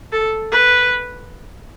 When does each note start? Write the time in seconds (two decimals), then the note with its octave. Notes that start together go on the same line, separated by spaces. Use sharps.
0.12 A4
0.52 B4